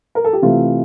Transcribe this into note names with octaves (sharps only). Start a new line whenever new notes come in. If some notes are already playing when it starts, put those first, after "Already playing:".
A#4
A4
G4
C3 E3 A3 F4